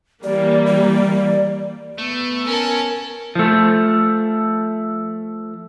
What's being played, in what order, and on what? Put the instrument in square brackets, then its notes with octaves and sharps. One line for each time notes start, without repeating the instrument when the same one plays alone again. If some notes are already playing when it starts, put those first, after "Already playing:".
[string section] E3 G3 A#3 [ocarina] D5
[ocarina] D5
[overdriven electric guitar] A3 [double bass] B3
[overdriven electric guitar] C#4 [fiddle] A#4 A5
[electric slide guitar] F3 A3